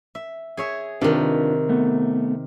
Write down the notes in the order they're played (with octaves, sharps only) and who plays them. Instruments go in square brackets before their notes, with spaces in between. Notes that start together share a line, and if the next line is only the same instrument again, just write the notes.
[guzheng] E5
G#4 C#5 E5
[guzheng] C3 D#3 [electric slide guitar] D4 F4 B4
[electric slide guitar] A3 B3